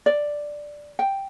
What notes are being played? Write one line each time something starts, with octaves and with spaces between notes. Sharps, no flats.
D5
G5